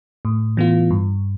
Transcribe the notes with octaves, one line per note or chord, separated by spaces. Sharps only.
A2
E3 B3 F4
G2